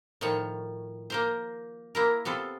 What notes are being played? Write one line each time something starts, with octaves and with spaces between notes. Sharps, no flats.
A2 D#3 F3 C#5
A#3 A#4 C5
A#3 E4 A#4
C3 B3 F4 A4